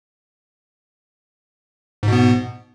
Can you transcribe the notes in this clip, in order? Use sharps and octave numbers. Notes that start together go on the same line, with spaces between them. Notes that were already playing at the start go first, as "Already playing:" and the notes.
G#2 B2 B3